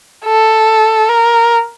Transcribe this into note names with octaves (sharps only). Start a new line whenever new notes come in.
A4
A#4